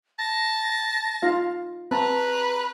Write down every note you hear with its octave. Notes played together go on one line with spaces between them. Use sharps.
A5 A#6
D#4 F4 F5
C4 B4 A5 A#5